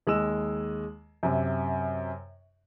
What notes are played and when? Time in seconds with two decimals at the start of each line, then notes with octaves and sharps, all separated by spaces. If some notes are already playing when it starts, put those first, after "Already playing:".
0.07 D#2 G#3 D#5 E6 E7
1.23 F#2 C3